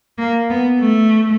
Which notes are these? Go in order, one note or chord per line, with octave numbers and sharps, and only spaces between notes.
A#3
B3
A3